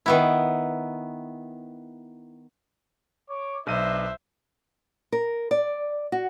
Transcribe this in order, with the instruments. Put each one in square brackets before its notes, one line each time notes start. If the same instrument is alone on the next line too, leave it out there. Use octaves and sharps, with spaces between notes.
[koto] D#3 B3 E4
[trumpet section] C#5 D6
[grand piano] B1 D#7 [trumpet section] D4 B4 D#5 [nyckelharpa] C5 E5
[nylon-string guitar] A#4
D5
F#4